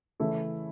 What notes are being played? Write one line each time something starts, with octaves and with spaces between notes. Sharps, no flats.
C#3 E3 A3 E4 A4